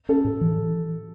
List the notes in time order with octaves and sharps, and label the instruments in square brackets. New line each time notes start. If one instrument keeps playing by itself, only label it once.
[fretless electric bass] C#4 [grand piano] A4
[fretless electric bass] A2
E3